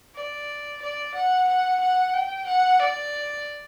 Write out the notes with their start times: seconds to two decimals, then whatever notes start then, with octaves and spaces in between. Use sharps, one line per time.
0.16 D5
0.82 D5
1.15 F#5
1.48 F#5
1.81 F#5
2.14 G5
2.47 F#5
2.80 D5